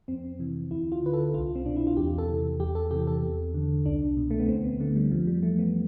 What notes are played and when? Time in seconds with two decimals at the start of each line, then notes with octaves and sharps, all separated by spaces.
0.08 F2 C4
0.39 C3 E3
0.71 D2 E4
0.92 F4
1.03 D3 B4
1.13 A4
1.34 C2 F4
1.55 C4
1.66 B2 D4
1.76 E4
1.87 F4
1.97 E2 G4
2.18 A4
2.28 C3 E3
2.60 E2 G4
2.75 A4
2.91 C3 E3 G4
3.07 A4
3.23 E2
3.54 D3
3.86 C2 D4
4.17 B2
4.31 A3
4.40 B3
4.48 D2 C4
4.64 B3
4.80 D3 A3
4.96 G3
5.11 F2 F3
5.27 G3
5.43 E3 A3
5.59 B3